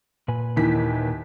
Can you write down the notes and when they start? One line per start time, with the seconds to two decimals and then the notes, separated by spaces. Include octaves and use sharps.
0.28 A#2 B4 G#5
0.56 D#2 E3 B6